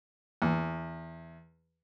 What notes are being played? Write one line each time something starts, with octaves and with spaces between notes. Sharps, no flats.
E2